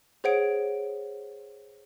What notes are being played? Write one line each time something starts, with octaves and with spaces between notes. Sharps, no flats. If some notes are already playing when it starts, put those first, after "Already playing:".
G#4 C5 C#5 F#5 D7